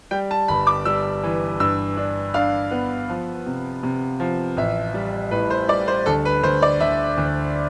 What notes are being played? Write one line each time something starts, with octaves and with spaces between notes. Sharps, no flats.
G3 G5
A5
G1 B5
D6
G3 E6
E3
G2 E6
D4
D4 F5
B3
F3
C3
C3
F3
A1 E5
G3
A2 B4
C5
G3 D5
C5
D2 A4
B4
D2 C5
D5
D2 E5
D2